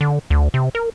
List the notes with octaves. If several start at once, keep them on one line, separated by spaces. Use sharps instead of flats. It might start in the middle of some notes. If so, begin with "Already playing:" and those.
D3
D2
C3
A#4